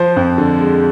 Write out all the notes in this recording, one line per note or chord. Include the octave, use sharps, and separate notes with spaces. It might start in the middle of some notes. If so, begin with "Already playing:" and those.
Already playing: F3 C5
F2
D3
G#3